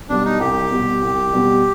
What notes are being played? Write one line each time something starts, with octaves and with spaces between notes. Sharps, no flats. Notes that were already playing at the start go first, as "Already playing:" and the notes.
B2 G3 D4
D#4
C2 G4
B2 G3
C2
B2 G3